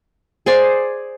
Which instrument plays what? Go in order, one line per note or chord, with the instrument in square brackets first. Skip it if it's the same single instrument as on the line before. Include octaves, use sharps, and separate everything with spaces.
[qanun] G#4 C5 D5 G#5